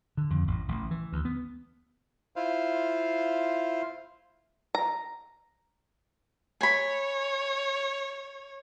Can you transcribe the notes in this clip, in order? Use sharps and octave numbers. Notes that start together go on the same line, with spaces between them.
D3
F2
A1
A1
E3
D2
B3
E4 F4 C5 F5
A#5
C#5 G#5 B5